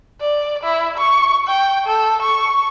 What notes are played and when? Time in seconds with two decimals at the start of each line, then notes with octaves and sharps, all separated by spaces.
0.21 D5
0.64 E4
0.98 C#6
1.48 G5
1.87 A4
2.22 C#6